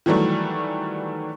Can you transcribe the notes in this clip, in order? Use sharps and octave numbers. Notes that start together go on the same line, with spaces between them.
D#3 E3 F#3 G3 A3